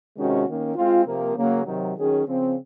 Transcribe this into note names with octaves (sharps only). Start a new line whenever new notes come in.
C3 D#3 G#3 C#4 F#4
D#3 A#3 C#4
G#3 C4 F4
C3 F3 A#3
C#3 F#3 A#3 C#4
C3 D#3 F#3
D#3 F#3 C#4 G#4
C#3 F3 C4